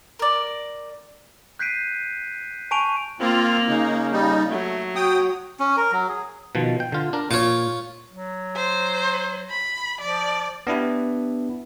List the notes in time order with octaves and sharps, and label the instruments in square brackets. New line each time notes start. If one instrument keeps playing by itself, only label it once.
[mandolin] A#4 D5
[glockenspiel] F#6 G6 B6 C7 D7 D#7
G#5 A5 C#6 D7 D#7 F7
[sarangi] A#3 [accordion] C4 F4
[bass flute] C#3 [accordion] D#4
[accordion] G3 D#4
[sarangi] F#3 [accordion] A3
[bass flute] F#4 [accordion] G5 D#6
[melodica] C#4
A#4
F#3
G#4
[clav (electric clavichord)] B2 D#3 F3
G5
D3 F4
D4 A#4
[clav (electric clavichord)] A#2 [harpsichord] F4 C#5
[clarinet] F#3
[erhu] C5
B5
[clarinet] F3 [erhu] D5
[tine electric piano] B3 D4 E4 G4